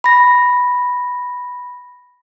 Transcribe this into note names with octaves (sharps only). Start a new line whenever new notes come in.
B5 A#6